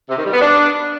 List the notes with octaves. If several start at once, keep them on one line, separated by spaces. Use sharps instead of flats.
C3
D#3
G3
B3
D4